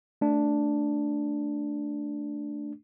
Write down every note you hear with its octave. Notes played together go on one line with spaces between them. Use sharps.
A3 D4